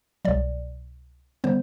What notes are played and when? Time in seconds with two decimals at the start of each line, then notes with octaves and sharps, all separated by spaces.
0.25 C2 B2 F#3 D5
1.44 D3 G3 B3 C5